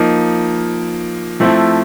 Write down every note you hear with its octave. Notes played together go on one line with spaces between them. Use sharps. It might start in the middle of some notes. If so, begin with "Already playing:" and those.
Already playing: F3 A#3 D#4
F3 A3 C4 E4